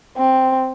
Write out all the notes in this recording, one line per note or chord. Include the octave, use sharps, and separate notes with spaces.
C4